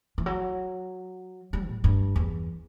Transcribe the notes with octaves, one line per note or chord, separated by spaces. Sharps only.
E3
F#3
G3
A2
G2
E2